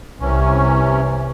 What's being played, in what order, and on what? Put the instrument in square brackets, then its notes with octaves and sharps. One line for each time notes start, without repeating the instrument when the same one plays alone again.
[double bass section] C2 [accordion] C3 E3 C#4